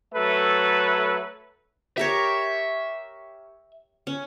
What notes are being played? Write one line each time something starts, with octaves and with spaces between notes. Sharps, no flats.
F#3 A3 A4 B4
G4 A#4 C#5 E5
C#4